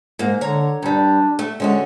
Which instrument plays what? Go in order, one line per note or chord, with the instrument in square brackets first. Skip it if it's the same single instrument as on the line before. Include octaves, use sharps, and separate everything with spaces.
[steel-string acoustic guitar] G#2 A#3
[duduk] D3 [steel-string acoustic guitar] C#5 A#5
[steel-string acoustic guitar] G2 G3 [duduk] D4
[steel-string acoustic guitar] A3
[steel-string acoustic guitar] D3 C#4 F#4 [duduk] G#3